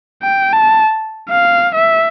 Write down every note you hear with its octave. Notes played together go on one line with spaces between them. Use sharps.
G5
A5
F5
E5